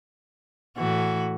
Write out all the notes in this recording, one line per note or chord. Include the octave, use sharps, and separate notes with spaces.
A2 E3 F#4